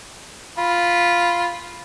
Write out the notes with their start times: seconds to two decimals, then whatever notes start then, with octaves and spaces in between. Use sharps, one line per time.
0.58 F4 B5